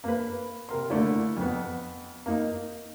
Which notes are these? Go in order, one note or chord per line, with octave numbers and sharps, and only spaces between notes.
A#3 B4
C3 A#4 C6
D3 A3 A#3 D4 E4
F2 B3
A#3 D#4